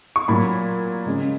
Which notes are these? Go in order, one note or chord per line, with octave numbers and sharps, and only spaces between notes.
C#6
A#2 F#3 B5
C#3 G#3